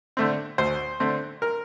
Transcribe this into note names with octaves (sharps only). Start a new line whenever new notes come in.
D3 A3 C4
D2 C5
D3 A3 C4
A#4